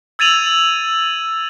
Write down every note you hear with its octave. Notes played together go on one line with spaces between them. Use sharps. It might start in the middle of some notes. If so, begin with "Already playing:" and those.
E6 G#6 A6 D#7 F7 F#7